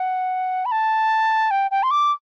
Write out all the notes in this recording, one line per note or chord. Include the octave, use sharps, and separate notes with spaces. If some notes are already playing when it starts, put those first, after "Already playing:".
Already playing: F#5
B5
A5
G5
G5
C6
D6